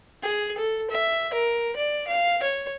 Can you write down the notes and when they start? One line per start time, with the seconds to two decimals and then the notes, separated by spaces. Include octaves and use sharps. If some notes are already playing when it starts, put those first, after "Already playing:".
0.23 G#4
0.57 A4
0.91 E5
1.33 A#4
1.76 D5
2.07 F5
2.43 C#5